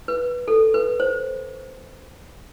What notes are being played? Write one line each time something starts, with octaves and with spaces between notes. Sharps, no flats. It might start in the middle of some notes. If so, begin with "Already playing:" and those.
B4
A4
B4
C5